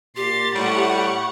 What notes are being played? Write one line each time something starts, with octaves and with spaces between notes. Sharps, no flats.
A#2 G4 C6 A6
A2 G3 F#5 C#6